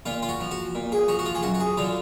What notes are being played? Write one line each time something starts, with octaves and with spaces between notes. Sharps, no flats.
A#2 F4
F4
F#4
F3
F#4
A#2
G#4
F3 F#4
F#4
F4
G#4
F#2 F#4
F#4
G#4
D3 F#3 F4